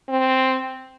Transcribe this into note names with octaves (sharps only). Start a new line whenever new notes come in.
C4